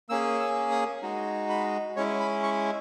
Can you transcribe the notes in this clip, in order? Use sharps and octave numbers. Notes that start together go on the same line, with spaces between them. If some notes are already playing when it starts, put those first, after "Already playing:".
A#3 C#4 G#4 E6
E6
D#6
G#3 D#4 F#4
B5
G#3 C#4 E4 C#5
B5
C#6